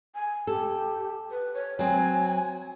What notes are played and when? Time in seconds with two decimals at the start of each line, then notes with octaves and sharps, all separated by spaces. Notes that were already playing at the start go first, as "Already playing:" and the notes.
0.15 G#5
0.47 G4 A4
1.31 B4
1.54 C#5
1.79 F#3 C4 G#5